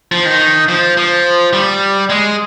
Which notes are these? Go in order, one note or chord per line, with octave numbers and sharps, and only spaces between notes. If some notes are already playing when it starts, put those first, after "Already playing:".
F3
D#3
F3
F3
G3
G#3